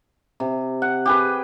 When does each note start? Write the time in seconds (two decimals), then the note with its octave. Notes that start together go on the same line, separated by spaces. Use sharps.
0.40 C3
0.82 F#5
1.06 G4 G#4 B4